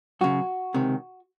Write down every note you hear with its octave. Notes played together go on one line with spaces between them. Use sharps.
F#2 C#3 F#4
C#2 C3 D#3